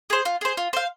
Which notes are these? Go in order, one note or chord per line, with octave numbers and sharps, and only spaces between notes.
G#4 C5
F4
G#4 C5
F4
C5 F5